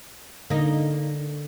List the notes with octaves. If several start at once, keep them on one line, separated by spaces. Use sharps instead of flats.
D3 A#3 D#4